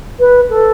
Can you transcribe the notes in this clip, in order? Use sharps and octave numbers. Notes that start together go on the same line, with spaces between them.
B4
A4